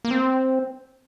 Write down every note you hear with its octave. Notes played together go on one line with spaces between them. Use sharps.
A#3
C4